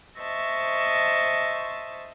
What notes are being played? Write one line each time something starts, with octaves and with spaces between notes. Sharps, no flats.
C5 D#5 E5 A5 C#6